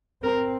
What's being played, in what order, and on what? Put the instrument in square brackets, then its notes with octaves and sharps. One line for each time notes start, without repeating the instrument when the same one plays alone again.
[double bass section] C4 [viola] A#4